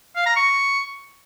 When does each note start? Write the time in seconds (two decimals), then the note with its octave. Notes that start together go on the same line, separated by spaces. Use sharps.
0.16 F5
0.26 A#5
0.36 C#6